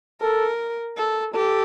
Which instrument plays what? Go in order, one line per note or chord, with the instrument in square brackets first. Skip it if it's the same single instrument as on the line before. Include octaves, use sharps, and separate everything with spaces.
[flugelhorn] A4 [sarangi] A#4
[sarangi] A4
[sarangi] G4 [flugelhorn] A4